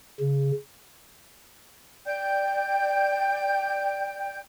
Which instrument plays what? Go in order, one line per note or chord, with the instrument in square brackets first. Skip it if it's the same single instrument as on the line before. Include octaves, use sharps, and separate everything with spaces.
[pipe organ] C#3
[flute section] D5 G5 G6